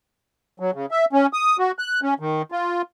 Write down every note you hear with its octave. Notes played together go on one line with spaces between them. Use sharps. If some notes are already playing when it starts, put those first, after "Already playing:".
F#3
C#3
E5
C#4
D#6
F#4
F#6
C#4
D#3
F4